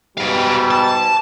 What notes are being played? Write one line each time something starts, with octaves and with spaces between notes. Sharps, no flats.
G#2 B2 G3 G4 F5
A5